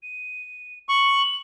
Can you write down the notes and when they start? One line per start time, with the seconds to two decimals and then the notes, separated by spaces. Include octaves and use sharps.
0.03 D#7
0.89 C#6 F#7